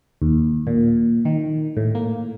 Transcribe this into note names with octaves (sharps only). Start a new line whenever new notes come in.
D#2
A#2
D#3
A2
A#3